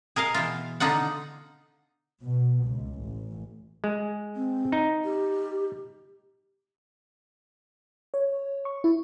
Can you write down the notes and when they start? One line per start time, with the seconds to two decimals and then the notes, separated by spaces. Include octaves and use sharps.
0.16 G#4 A#4 D#5 F5
0.34 B2 E3 F4
0.80 D3 D#4 F4 F#5
2.22 B2
2.66 C#2
3.02 A1
3.84 G#3
4.36 C4
4.72 D#4
5.05 G4
8.14 C#5
8.65 C#6
8.84 E4